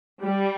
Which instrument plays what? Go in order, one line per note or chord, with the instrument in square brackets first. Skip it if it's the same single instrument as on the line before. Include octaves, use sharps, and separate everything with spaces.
[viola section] G3